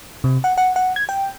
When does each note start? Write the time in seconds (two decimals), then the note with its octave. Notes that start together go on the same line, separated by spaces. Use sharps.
0.24 C3
0.44 F#5
0.58 F#5
0.76 F#5
0.96 G#6
1.09 G5